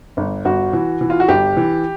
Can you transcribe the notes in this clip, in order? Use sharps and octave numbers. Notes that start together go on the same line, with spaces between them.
G1
G1 F#4
E3
E3
F4
F#4
G1 G4
E3